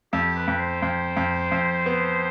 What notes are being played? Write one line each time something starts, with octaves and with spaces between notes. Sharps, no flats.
F2 G4
B4
F2
C5
F2 C5
F2
F2
B3